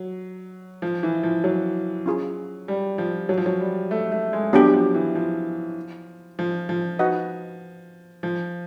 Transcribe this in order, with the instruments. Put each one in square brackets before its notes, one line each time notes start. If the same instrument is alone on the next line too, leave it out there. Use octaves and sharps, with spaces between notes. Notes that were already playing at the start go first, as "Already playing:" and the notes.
Already playing: [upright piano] F#3
F3
E3
F3
F#3
[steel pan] C#4 F4 G#4
[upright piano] G3
F3
F#3
F3
F#3
G3
A3
A3
G#3
[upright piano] F#3 [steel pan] B3 D4 G4
[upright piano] F3
E3
F3
F3
F3
[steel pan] D#4 F#4 B4 D#5 F#5
[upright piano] F3